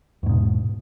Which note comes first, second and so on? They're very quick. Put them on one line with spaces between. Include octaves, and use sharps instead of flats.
E2 G#2 B2